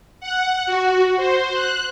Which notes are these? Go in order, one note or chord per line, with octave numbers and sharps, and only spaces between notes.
F#5
F#4
C5
F#6